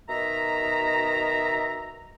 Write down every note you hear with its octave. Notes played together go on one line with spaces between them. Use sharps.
B2 D#3 E5 A#5